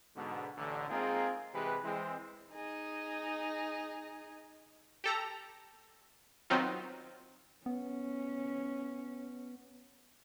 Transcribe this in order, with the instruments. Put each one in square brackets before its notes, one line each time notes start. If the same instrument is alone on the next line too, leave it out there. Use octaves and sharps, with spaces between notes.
[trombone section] G#2 B2 D3
A1 D3
G#3 A#3 C4 D#4 F4 G#4
C3 E3 G#3 G4 B4
E3 G#3 C4
[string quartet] D#4 G#4 D#5
[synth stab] G4 A4 A#5
D#3 F#3 B3 C4 D#4 F4
[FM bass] B3 [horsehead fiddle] C#4